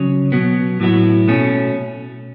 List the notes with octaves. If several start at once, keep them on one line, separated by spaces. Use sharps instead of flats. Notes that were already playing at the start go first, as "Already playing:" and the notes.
Already playing: C#3 F#3 C#4
B2 F#3 B3
A2 F#3 B3 E4
B2 A3 C#4